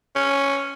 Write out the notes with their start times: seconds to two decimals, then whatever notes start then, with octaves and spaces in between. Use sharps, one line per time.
0.16 C#4